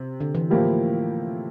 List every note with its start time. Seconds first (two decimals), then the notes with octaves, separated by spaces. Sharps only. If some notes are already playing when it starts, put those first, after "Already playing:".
Already playing: C3
0.20 D3
0.35 E3
0.50 A2 F3 A#3 E4 G4